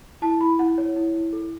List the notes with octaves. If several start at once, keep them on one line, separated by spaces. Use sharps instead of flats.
E4 A5
E4 B5
E4 F#5
C#5
E4
E4
A4